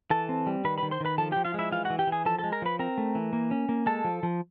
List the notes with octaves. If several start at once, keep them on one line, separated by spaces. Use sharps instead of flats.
E3 A4 A5
C4
G3
D#3 B4 B5
D#3 B4 B5
C5 C6
D#3 B4 B5
F3 A4 A5
F3 G4 G5
F4 F5
G#3 E4 E5
E3 F4 F5
F#4 F#5
E3
G4 G5
E3
G#4 G#5
F3 A4 A5
A4 A5
G#3
A#4 A#5
F3 B4 B5
C4 A#4 A#5
A3
E3
A#3
C#4
A#3
G#3 A4 A5
F3
F3